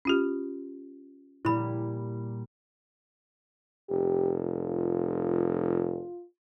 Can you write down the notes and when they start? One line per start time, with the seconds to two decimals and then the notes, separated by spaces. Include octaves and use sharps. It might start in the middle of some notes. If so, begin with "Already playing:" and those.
0.05 C#4 F4 G4
1.45 A#2 G3 E4 B5
3.90 F1 G4
4.44 F4